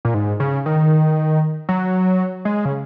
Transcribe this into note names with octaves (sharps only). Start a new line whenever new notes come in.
A#2
G#2
C#3
D#3
F#3
G#3
C#3